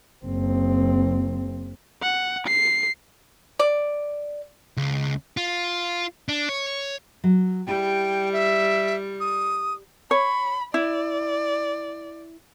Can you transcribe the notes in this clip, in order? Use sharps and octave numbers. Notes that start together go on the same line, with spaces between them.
F#1 C4
F#5
C7
D5
C#2
F4
D4
C#5
F#3
G3 E4 G4 G#4 G5
E5
D#6
C#5 B5
E4 D5